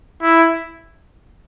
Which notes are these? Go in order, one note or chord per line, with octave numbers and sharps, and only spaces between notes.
E4